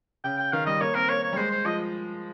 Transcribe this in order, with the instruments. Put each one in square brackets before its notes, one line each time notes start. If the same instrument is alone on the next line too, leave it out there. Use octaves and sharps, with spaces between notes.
[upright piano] C#3 [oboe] G5
[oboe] G5
[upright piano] D#3 [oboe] F5
[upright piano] G3 [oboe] D#5
[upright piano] A#3 [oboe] C#5
[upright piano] C4 [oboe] A#4
[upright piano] A#3 [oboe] C#5
[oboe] C#5
[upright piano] G3
[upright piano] G#3 [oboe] C5
[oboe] C5
[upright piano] F3 [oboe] D#5